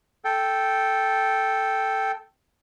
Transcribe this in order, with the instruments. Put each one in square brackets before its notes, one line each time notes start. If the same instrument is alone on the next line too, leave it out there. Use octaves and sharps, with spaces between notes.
[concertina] A4 G5